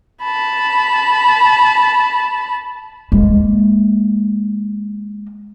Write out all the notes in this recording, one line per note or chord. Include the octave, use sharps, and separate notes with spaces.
A5 B5
G#3 A#3